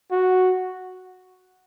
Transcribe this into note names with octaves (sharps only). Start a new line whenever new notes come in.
F#4